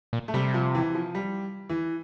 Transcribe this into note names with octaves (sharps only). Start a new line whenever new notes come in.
A#2
A3
C3 G3
F3
E3
F3
G3
E3